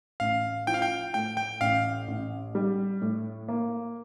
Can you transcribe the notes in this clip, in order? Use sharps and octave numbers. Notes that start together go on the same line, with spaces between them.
A1 F5
F3 G5
F5
G5
A2 G5
G5
A1 F5
A1
G3
A2
A#3